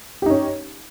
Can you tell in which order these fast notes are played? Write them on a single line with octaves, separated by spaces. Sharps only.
G4 D#4 C#4